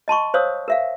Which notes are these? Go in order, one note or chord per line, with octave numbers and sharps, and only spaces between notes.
D#5 A5 C6 C#6
C5 C#5 F5 D#6 E6
A#4 E5 F5